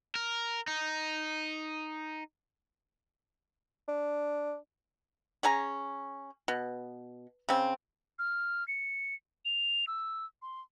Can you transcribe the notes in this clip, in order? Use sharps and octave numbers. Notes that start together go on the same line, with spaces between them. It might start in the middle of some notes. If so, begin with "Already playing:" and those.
A#4
D#4
D4
C#4 G#4 G#5 A#5
B2
C#3 C4
F6
C#7
F7
E6
C6